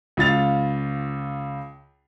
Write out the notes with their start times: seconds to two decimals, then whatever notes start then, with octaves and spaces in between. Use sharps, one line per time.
0.17 C#2 F4 A6 F7